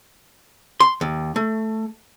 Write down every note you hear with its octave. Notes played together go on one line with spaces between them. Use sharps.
C6
D#2
A3